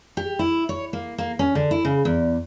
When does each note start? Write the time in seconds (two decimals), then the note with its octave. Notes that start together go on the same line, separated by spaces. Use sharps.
0.17 G4
0.39 E4
0.69 C#5
0.93 A#3
1.18 A#3
1.39 C#4
1.55 D3
1.71 E4
1.85 C#3
2.05 E2